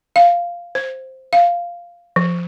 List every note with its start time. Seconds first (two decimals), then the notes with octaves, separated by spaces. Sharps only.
0.16 F5
0.75 C5
1.33 F5
2.16 F3